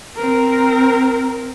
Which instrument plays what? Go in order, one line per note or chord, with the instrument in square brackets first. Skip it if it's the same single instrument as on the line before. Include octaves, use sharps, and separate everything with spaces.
[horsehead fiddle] C4 A#4